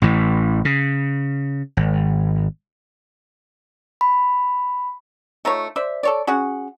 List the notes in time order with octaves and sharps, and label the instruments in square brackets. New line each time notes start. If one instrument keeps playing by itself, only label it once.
[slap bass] A1 A2 E3
C#3
G#1
[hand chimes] B5
[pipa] A3 D#4 F4 C#5
C5 D5 E5
A4 C#5 D5
C#4 F#4 G#4 F#5